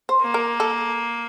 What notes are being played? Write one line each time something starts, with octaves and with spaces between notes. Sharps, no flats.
C5
A#3
A#4
A4